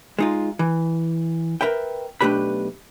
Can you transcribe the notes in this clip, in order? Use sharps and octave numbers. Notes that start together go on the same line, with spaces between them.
G#3 D#4 F4
E3
A#4 B4 E5 G5
B1 A3 D4 G4 B4 B5